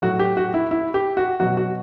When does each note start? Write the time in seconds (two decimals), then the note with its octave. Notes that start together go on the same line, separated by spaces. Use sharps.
0.02 A2 F#3 F#4
0.19 G4
0.37 F#4
0.54 E4
0.71 E4
0.94 G4
1.17 F#4
1.40 B2 F#3 F#4
1.57 F#4